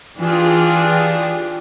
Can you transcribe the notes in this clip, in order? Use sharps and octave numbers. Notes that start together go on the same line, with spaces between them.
E3 D4 F4 G4 G#4